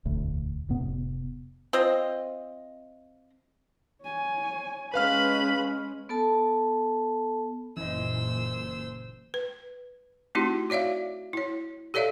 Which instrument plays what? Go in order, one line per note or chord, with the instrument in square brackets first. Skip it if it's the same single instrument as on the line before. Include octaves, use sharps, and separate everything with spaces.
[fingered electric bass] E1 D2 A2
F1 A2 C3 B3
[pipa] C4 F4 D#5
[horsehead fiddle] C#5 G#5
[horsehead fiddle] G#3 C#4 [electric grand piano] B4 F5 F6 [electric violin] B5
[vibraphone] B3 A4 A5
[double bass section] F#1 A#2 [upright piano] E3 D#5 [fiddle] C5 E6
[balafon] B4
A3 C4 D#4 E4 F#4 G4
F#4 C#5 D5 E5 F5
E4 C#5
G4 A4 C#5 D5 E5 F5